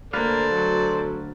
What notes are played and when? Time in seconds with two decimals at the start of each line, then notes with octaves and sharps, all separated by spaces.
0.13 D2 A#3 A4 B4 C5 D5 F5
0.55 F#3